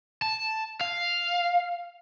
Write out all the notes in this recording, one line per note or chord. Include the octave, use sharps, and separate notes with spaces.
A5
F5